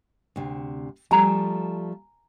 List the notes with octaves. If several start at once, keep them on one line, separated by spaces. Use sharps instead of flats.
D2 C3
F3 G3 A3 G#5 A#5